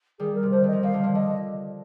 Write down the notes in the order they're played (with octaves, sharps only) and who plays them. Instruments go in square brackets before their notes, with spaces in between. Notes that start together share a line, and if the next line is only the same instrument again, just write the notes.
[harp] D#3 G3 [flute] G#4
[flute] A#4
[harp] C3
[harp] D3 [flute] C5
[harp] D#3 [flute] D#5
[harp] F3
[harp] D#3 G3 [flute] F5
[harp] D3 F3
D3 F3
[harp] D3 [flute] D#5